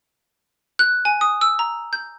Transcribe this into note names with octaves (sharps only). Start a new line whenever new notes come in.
F#6
G#5
D#6
E6
A#5
G6